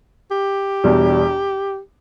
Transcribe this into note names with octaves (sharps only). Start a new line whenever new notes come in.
G4
E1 E2 B2 G3 D4